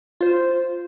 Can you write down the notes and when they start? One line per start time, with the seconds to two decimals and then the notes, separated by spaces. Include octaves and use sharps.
0.21 F4 C5